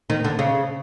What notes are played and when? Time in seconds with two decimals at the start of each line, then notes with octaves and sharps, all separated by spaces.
0.10 D#3
0.24 D3
0.39 C#3